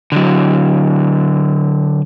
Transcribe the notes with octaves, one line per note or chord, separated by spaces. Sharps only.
D3 F#3